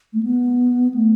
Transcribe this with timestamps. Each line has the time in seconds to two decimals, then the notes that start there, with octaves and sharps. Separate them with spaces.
0.13 A3
0.23 B3
0.94 A3